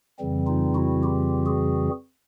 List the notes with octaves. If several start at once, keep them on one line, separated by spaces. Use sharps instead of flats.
F2 C#3 E3 G3 C4
D#4 F4
E4 F#4
F4 G4
F#4 G#4